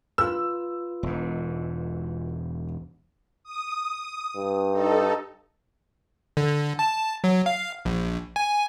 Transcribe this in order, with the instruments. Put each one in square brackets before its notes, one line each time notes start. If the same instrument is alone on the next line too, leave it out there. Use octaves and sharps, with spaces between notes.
[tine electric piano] F4 B4 [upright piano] E6
[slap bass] E1 G#2
[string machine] D#6
[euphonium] G2
[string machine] D#4 A4
[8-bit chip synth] D3
A5
F#3
F5
A#1
G#5